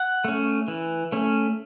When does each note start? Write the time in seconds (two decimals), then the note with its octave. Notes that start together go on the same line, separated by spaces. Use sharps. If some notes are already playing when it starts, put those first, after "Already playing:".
Already playing: F#5
0.24 A3 C#4
0.68 E3
1.12 A3 C#4